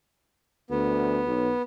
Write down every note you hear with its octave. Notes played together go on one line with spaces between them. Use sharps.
D2 B3
B1